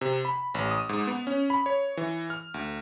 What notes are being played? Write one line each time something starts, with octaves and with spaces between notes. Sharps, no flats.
C3
B5
A1
D#6
G#2
B3
C#4
B5
C#5
E3
F6
D2